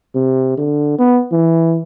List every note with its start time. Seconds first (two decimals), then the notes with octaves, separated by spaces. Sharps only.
0.15 C3
0.57 D3
0.99 B3
1.32 E3